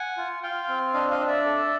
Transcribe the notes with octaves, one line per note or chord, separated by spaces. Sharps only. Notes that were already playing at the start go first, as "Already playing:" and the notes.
Already playing: F#5 G#5
F4
F4 F5 G5
C4
D4 D#5 F5
D#5 F5
D4
D5 E5
A4